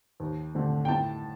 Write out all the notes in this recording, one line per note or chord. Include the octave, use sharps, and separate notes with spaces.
D#2
D3 A3 C4
G5
A2 A5